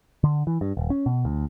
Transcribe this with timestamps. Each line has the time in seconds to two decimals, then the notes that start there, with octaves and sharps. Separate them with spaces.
0.24 D3
0.47 E3
0.61 G2
0.77 D#1
0.90 C#4
1.06 B2
1.25 D2